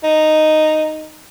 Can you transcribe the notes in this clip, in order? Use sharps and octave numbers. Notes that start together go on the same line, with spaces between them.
D#4